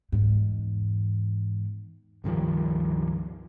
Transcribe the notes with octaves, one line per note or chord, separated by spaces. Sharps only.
E2 G#2
C#2 G2 D#3 F3